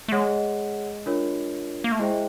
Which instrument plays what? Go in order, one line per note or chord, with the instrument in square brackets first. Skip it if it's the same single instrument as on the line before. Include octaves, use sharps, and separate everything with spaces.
[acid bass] A3
[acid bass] G#3 [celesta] G#4 C#5 F#5
[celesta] D4 F4 A#4 C#5
[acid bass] A#3
A3
[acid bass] G#3 [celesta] E4 G#4 C5 E5 G5